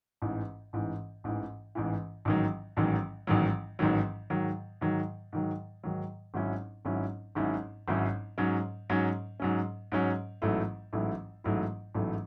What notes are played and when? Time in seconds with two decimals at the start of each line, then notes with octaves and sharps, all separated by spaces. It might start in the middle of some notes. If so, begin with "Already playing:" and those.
0.22 A1 G#2 E3
0.73 A1 G#2 E3
1.24 A1 G#2 E3
1.75 A1 G#2 E3
2.25 A1 G#2 D#3 F#3
2.77 A1 G#2 D#3 F#3
3.27 A1 G#2 D#3 F#3
3.79 A1 G#2 D#3 F#3
4.30 G#2 D#3 F#3
4.81 G#2 D#3 F#3
5.33 G#2 D#3 F#3
5.84 G#2 D#3 F#3
6.34 G#1 G#2 F#3 C#4 E4
6.85 G#1 G#2 F#3 C#4 E4
7.35 G#1 G#2 F#3 C#4 E4
7.88 G#1 G#2 F#3 C#4 E4
8.38 G#2 F#3 C#4
8.90 G#2 F#3 C#4
9.40 G#2 F#3 C#4
9.92 G#2 F#3 C#4
10.42 A1 G#2 F#3 A3 E4
10.93 A1 G#2 F#3 A3 E4
11.44 A1 G#2 F#3 A3 E4
11.95 A1 G#2 F#3 A3 E4